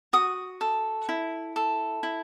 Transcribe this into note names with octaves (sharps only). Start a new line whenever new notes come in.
F#4 D#6
A4
E4
A4
E4